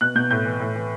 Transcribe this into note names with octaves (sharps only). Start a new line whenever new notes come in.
B2 F#6
B2 G6
A2 G6
E3
A2
E3